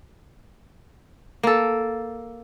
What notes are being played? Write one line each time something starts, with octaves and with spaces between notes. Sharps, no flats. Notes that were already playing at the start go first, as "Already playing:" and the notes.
A#3 A4